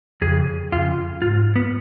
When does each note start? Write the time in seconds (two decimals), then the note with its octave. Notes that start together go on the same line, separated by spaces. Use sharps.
0.22 F2 C#3 G#4
0.72 F2 C#3 F4
1.22 G#2 F4
1.56 B3